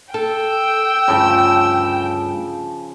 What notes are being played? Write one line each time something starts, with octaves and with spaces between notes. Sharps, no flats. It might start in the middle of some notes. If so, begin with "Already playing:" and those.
A4 G5 E6
D2 G2 C#3 F3